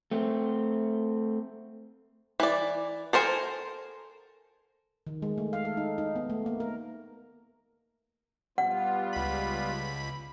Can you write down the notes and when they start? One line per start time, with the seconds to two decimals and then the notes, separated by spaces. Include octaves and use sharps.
0.11 A3 C4
2.40 E3 D5
3.13 A4 A#4 C5 G#5
5.07 D#3
5.22 G#3
5.38 A3
5.53 F5
5.65 A4
5.77 D#4
5.98 D#4
6.16 B3
6.30 A3
6.46 A#3
6.60 A#4
8.58 G3 B3 F4 F#5
9.13 C#2 B5